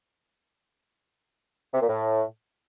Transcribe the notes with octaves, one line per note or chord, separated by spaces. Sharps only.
C3
A#2
A2